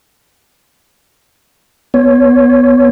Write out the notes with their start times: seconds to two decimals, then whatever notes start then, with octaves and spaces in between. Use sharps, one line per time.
1.94 B3 C#5